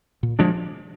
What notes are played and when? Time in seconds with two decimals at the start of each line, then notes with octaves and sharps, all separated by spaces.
0.23 A#2
0.39 F3 G#3 D4